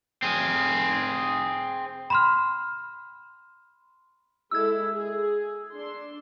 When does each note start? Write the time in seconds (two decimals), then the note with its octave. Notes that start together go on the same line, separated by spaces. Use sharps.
0.23 C4 G#4
2.10 B5 C6 F6
4.51 G#3 E4 A4 E6 G#6
4.93 G#4
5.73 D4 C6